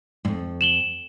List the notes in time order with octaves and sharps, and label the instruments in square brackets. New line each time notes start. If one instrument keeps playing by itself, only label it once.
[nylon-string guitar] F2 G#2
[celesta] E7 F#7 G7